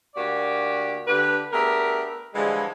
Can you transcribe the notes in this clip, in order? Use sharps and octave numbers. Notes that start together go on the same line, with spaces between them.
D2 A#3 F#4 G4 D5
D3 G4 B4
A3 B3 D4 G4 G#4 A#4
D3 E3 F3 G3 G#3